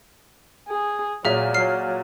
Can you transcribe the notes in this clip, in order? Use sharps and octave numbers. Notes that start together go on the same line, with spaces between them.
G#4
A#2 F#3 G#4 E5
F#3 F6 C7